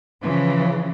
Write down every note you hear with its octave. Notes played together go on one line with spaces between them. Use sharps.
C#3 E3 F3